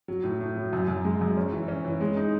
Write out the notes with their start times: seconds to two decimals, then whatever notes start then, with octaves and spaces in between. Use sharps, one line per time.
0.08 F#3
0.24 A2
0.41 A2
0.56 F#3
0.73 F#2
0.88 F#2
1.04 G#3
1.21 F#2
1.37 C#4
1.53 E3
1.68 C#4
1.85 E3
2.01 G#3
2.17 D#4